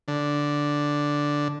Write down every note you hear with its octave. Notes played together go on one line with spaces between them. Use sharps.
D3